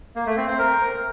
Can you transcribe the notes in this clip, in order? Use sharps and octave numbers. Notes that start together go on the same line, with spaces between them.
A#3
A3
C4
C5
A#4